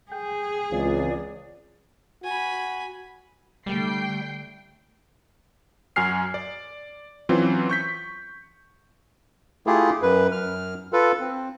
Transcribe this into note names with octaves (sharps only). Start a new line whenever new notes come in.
G#4 G5
C#2 E3 C4 F4 D5
F#4 G#5 B5
D3 G3 A3 G5 C7
F#2 F#4 G#5 F6 C7
D5
E3 F#3 C4 C#4 F4
C#6 G6 B6
A3 E4 F4 G4 G#4
F#2 B4
F#2 F6
F4 A4 B4
C4